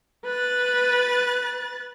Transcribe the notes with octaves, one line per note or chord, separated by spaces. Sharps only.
B4 F#6 A6